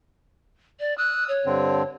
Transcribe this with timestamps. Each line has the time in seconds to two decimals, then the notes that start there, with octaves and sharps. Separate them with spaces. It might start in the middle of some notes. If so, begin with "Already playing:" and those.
0.80 D5
0.98 D#6 E6 F#6
1.28 C#5
1.45 G2 D3 C4